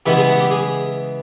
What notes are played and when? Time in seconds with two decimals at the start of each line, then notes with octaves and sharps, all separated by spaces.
0.06 C#3 E3 G#3 B3 G4
0.17 G#4
0.28 F#4
0.40 G4
0.50 G#4